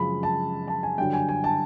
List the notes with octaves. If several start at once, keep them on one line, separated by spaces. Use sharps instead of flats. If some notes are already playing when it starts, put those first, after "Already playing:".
Already playing: F#2 C#3 F3 G#3 B5
A5
A5
G#5
G2 D3 F#3 G5
G#5
G#5
A5